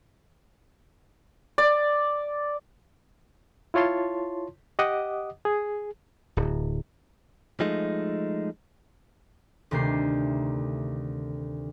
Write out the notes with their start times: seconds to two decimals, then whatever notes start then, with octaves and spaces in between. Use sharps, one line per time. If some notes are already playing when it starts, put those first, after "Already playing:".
1.58 D5
3.74 E4 F4 C#5 A5 C6
4.79 G4 D#5 F#5 D6 D#6
5.45 G#4
6.37 D1
7.60 F3 G#3 A3 D#4
9.71 D2 C3 D#3 A3 G6 C7